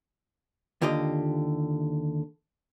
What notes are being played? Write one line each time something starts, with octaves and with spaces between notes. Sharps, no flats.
D#2 D3 F4 G4 D#5